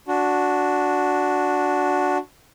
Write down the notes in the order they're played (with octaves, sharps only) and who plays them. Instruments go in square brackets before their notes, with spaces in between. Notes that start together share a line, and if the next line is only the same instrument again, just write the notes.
[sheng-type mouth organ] D4 F#4